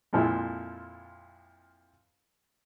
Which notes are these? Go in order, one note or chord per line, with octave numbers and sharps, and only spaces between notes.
F2 A#2 F3 G#3 E4